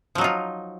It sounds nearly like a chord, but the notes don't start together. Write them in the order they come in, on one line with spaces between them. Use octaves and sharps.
F3 F#3 D#4 F4